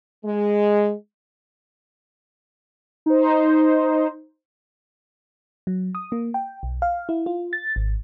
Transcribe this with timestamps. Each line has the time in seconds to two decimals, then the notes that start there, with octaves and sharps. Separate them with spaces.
0.25 G#3
3.06 D#4 C5
5.67 F#3
5.95 D#6
6.12 A#3
6.34 G5
6.63 B1
6.82 F5
7.09 E4
7.26 F4
7.53 A6
7.76 G#1